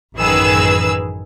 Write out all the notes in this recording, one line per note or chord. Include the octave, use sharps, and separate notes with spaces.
A1 F#2 D#3 G#4 B4 E6